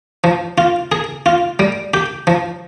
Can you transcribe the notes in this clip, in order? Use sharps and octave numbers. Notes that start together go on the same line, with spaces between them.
F3
F4
G#4
F4
G3
G4
F3